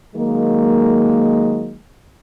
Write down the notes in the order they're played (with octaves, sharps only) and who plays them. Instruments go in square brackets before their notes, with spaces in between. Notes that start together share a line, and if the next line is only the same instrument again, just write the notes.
[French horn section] D#3 F#3 G#3 A#3